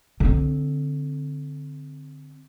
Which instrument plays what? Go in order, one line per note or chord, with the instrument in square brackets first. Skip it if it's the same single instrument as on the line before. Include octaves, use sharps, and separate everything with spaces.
[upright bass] D3 C4